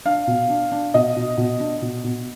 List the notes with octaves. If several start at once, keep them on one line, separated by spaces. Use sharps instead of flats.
D4 F5
B2
D4
D4
B2 D#5
B2
B2
D4
B2
B2